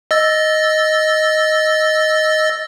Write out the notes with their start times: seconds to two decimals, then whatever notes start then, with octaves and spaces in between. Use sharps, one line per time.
0.11 D#5 E6 A6